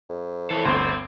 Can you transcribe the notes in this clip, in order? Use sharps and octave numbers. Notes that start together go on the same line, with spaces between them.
F2
E3 A4 C#5
G1 D2 C4 C5